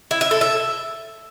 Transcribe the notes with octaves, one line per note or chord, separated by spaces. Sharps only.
E4
E5
A4
E5